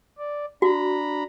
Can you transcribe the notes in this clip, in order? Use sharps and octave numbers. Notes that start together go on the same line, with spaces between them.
D5
D4 F#4 A#5 B5